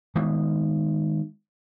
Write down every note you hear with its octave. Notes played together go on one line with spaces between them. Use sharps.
D#3 G#3 B3